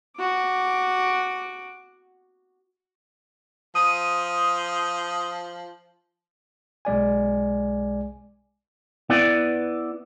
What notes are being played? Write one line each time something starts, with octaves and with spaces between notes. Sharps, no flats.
F#4 D6
F3 D#6 D#7
B1 G#3 D5 G#5
B3 E4 B4 D5